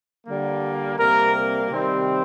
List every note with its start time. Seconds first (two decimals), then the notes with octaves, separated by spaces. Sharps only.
0.25 D3 G3 A#3
0.98 C3 G3 A#3 A#4
1.69 C3 D#3 G3 C4